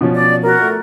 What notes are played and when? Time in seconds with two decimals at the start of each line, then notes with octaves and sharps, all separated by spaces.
0.01 B2 F3 C#4
0.15 D5
0.44 F#4 A#4
0.61 A3